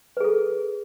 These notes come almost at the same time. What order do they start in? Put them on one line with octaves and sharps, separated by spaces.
B4 G#4 A4